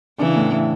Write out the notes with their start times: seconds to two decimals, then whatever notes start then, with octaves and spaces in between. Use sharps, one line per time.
0.19 C#3 E3 D4
0.36 A2
0.52 A2